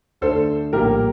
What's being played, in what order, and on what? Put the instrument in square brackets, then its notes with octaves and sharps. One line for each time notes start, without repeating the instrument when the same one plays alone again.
[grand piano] D2 D3 A3 D4 [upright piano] A4 C5
[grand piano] A#1 A2 G3 A#3 [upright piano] G4 A#4